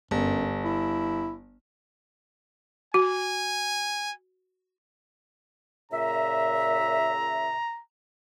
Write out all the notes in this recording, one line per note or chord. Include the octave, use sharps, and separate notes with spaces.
G1 F#2
E4
F#4 G#5
A#2 C#3 E5 A#5